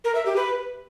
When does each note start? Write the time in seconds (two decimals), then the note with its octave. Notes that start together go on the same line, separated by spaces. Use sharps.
0.04 A#4
0.15 E5
0.26 G4
0.36 B4